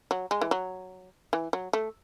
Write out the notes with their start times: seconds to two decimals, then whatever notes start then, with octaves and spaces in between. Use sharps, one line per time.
0.11 F#3
0.31 G#3
0.41 E3
0.51 F#3
1.33 E3
1.53 F#3
1.73 A3